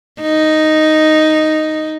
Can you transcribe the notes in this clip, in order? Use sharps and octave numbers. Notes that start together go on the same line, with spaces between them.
D#4